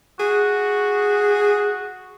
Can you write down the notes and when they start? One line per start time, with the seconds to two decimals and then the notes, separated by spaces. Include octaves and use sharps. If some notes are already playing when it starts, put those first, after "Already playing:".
0.20 F#4 G#4